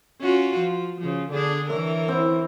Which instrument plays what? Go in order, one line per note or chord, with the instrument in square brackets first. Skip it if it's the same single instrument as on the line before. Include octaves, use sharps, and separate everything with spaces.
[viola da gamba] C#4 F4 F#4
F3
C#3 F3
D3 D4 G#4
[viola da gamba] E3 A#4 [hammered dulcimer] C#5 E5
[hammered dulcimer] C4 E4